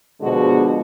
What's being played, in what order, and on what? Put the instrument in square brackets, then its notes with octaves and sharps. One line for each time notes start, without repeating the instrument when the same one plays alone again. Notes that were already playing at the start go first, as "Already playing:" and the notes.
[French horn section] B2 D3 F3 G#3 F#4